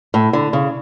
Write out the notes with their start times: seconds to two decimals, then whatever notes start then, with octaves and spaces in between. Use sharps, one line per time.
0.14 A2
0.33 D3
0.53 C#3